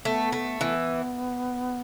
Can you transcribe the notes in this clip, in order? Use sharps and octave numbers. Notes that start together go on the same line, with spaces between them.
A3 B3
A3
E3 B3